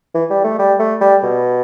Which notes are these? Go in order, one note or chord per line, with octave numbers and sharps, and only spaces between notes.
E3
G3
A3
G3
A3
G3
B2